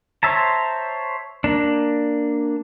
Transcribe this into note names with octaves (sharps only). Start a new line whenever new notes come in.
C5 C#5 E5 A5 A#5
A#3 D4